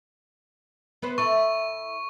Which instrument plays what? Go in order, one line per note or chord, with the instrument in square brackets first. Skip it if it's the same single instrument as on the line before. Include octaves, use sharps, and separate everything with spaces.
[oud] B3 B4 C5
[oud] E4 A4 [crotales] C#6